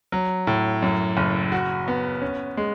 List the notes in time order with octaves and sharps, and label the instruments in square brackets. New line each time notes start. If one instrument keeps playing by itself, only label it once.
[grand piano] F#3
A2
F#2
F#1
F#4
B3
C#4
G#3